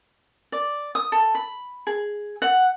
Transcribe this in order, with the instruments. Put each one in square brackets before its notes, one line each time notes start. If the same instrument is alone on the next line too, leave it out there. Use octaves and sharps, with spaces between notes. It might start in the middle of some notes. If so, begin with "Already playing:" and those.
[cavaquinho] D5
D#6
A4
B5
G#4
F#5